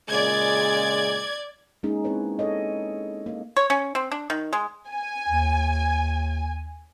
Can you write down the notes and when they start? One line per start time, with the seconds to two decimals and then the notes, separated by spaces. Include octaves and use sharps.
0.10 A#2 C#3 G#3 D5 G#6
1.83 G#3 A#3 C#4 D#4 G#4
2.04 C4 E4 B4 C#5
2.39 A4 C#5 D#5
3.26 A#3
3.57 C#5
3.70 C#4
3.95 C4
4.12 D4
4.30 D#3
4.53 G#3
4.88 G#5
5.29 D#2